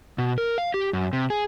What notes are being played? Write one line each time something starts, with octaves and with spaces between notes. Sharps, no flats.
B2
A#4
F5
G4
F#2
C3
G#4